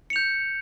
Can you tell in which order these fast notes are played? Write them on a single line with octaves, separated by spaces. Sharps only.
C#7 F7 G6